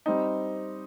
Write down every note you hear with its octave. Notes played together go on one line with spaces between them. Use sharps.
G3 C4 D#4